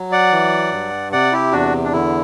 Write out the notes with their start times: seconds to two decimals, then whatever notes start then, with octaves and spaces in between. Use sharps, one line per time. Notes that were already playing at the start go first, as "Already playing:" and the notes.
Already playing: F#3
0.12 D5 F#5
0.32 E3
0.72 G2
1.12 C3 D5 F#5
1.32 E4 G4
1.52 E2 D4 F#4
1.85 D4
1.93 D3 E4